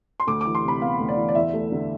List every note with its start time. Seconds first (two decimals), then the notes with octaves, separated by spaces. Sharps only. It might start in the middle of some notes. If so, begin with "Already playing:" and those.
0.20 C6
0.27 D2 D6
0.41 E3 D6
0.55 C6
0.63 C3 B5
0.81 B3 F5
0.99 D2
1.08 D5
1.17 E3
1.29 D5
1.35 E2 E5
1.54 A3
1.72 D3